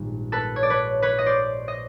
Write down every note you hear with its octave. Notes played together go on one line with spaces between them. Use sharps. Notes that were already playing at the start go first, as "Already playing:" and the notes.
Already playing: A#1 G#2 D#3 G3 B3
A4 B4
C#5
D5
B4 C#5
B4 C#5
D#5
C5 D5
D#5